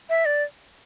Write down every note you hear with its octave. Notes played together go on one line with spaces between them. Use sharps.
E5
D5